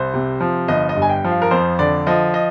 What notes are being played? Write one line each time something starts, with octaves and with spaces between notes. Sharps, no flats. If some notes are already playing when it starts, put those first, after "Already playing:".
Already playing: C2 C5
C3
F3
G1 D#5
D#5
G2
G#5
G5
F3
F5
A#4
F2 C5
D3 D5
F3 D#5
D#5